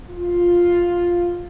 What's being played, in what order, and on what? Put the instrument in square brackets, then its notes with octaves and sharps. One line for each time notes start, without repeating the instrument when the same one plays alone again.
[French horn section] F4